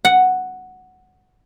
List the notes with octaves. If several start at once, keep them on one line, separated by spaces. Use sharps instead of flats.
F#5